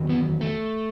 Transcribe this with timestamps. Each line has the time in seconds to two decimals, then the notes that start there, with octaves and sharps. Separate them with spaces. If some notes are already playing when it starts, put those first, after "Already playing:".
Already playing: E2 D#3 F#3
0.10 B3
0.41 A3